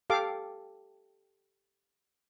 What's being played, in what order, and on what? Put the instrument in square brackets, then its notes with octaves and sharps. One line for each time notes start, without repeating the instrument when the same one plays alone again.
[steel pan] G4 A4 F5 D6